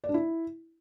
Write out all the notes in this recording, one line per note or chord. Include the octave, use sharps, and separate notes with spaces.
D5
D4
E4